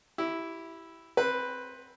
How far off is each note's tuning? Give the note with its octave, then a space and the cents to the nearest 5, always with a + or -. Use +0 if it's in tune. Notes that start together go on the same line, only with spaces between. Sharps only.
E4 +0 G4 -20
C4 +10 B4 +0